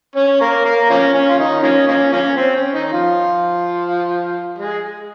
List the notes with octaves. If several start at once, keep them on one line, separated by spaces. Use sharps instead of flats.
C#4 C#5
A#3 A#4
A#3 A#4
F3 A#3 C#4
C#4
F4
D#3 D#4
F3 A#3 C#4
F3 A#3 C#4
F3 A#3 C#4
C4
C#4
D#3 D#4
F3 F4
G#3 G#4